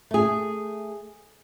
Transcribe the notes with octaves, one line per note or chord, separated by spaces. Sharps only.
A3 G#4